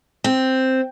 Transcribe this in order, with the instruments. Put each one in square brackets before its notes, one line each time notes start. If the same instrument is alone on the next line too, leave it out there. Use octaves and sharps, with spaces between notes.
[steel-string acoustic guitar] C4